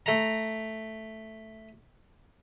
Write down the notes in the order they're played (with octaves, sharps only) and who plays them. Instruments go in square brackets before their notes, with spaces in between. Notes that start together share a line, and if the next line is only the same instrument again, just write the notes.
[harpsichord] A3 A#5